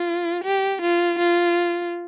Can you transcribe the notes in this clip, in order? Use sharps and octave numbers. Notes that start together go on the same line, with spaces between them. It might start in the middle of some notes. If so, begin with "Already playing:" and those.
Already playing: F4
G4
F4
F4